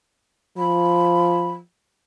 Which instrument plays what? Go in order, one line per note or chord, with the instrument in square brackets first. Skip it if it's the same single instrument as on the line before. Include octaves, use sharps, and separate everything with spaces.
[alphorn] F3 [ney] B5